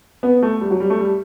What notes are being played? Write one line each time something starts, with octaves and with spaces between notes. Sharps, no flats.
B3
A3
G3
F#3
G3
A3
G3